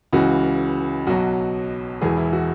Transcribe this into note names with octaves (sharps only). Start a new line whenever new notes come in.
C#2 C#3 E3 F#4
B1 B2 F#3 F#4
E1 E2 E3 G#4
E4
F#4